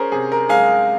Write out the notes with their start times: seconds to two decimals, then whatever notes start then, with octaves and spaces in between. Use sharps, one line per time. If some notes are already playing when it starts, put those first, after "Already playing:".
Already playing: C#4 G#4 A#4 C5
0.12 C3 G#4
0.32 A#4
0.49 G#3 F5 G#5